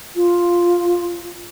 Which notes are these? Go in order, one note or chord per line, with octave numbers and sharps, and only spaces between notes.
F4